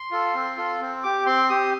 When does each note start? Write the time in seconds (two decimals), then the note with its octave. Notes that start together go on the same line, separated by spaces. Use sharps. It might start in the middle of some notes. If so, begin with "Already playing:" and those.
Already playing: C6
0.11 F4 A4
0.34 C4
0.57 F4 A4
0.81 C4
1.03 G4 D6
1.26 C4 C6
1.49 G4 D#6